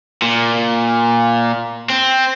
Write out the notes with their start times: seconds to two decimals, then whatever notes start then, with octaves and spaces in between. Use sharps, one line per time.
0.22 A#2
1.90 C4